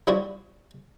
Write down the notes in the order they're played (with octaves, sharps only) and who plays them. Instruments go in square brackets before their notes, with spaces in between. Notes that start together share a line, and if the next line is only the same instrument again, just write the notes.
[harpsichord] F3 G3 D4 E4 F#4